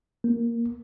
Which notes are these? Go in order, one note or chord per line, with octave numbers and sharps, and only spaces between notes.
A#3